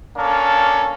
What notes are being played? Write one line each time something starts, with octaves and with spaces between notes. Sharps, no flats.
A#3 C#4 D4 A4